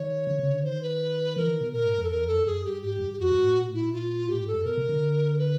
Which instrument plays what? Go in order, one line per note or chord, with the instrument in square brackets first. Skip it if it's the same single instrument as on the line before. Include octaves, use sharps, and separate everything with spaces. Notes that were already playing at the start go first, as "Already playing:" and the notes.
Already playing: [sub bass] D#3 [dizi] C#5
[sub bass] D3
C#3
D3
[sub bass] D#3 [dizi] C5
[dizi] B4
[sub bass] E3 [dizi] A#4
[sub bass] D#3
B2
[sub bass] A#2 [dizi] A#4
[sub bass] G#2
F2
[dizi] A4
[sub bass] E2 [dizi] A#4
[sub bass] F2
[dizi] A4
[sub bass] F#2
[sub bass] F#2 [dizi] G#4
[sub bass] G2 [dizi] G4
[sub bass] G#2 [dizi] G4
[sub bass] F#2
G2
[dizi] G4
[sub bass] F2 [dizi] F#4
[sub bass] G2
A2
A#2
A2
[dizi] E4
[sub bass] A#2
[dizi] F4
[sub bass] A2 [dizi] G4
[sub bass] G#2
[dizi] A4
[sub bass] F#2
[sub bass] B2 [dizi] A#4
[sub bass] C3
D3
[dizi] B4